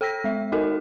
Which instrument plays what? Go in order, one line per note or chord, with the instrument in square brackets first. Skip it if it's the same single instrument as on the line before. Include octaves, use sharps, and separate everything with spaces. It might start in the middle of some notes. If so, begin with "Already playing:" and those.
[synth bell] A4 G5 E6 A#6 B6
G#3 E5
D#4 F#4 A4 A#4 D#5 G#5